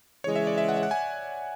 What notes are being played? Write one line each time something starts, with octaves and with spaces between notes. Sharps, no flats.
C#3 E3 G#3 C#5
E5
D5
E5
F#5
E5
F#5
G#5